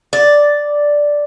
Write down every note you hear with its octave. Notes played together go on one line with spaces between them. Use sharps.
D5